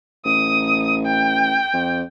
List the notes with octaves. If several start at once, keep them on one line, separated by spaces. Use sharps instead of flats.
A1 D#6
G5
F2